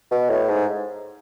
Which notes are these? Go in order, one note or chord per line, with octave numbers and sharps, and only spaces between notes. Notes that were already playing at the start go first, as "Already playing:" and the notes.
B2
A2
G#2